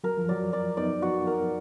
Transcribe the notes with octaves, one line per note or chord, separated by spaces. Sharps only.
F#3 A#4
F3
F#3 D5
D5
B3 D#4 D5
F#4
A#4